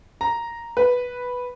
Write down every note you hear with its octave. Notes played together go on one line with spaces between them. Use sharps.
A#5
B4